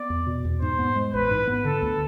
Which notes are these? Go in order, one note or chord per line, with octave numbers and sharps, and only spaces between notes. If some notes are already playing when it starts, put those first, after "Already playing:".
Already playing: B3 D5
E2
B2
E2
G#2 C5
B3
G#3
A1 B4
G#2
B3
D3 A4
D2